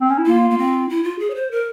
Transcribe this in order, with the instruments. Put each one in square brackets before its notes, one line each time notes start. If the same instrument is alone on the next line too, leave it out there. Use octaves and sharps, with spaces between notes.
[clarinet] C4
C#4
E4
[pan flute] A#3 [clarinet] F4
[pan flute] A#3
C4
E4
F4
G#4
C#5
C5
A#4